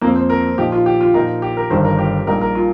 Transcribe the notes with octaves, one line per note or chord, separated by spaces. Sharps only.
F2 F3 A#3 C4
C5
A#4
A#2 F3 D#4 G4
F4
G4
F4
A#2 F3 D#4 A#4
G4
A#4
G1 G2 D#3 G3 C5
A#4
G4
A#1 A#2 G3 D#4 G4 A#4
A#4
F4